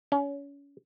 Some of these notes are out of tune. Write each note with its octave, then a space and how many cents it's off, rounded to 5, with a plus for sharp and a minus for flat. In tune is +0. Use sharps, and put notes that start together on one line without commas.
C#4 +30